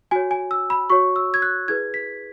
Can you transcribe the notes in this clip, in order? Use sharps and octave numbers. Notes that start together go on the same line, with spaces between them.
F#4 C#5 G#5
G#5
E6
B5
F#4 C#5 C#6
E6
G#6
F#6
E4 G#4 B4 G#6
B6